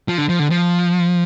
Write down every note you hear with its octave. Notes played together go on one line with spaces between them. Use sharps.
F3
D3
F3
D3
F3